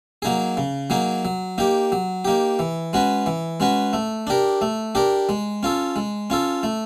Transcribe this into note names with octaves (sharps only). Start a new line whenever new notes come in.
F#3 A#3 D#4 G#4
C#3
F#3 A#3 D#4 G#4
F#3
A#3 D#4 G4
F#3
A#3 D#4 G4
E3
G#3 C#4 F#4 B4
E3
G#3 C#4 F#4 B4
A3
D4 G4 A#4
A3
D4 G4 A#4
G#3
C#4 F4 A4
G#3
C#4 F4 A4
A3